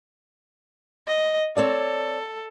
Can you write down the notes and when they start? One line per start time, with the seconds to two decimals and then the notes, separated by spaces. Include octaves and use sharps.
1.07 D#5
1.57 C4 A4 C#5 D5